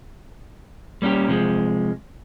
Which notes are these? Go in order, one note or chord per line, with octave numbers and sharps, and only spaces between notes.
G3 A#3 C#4 F#4 G4
C3 F3 G#3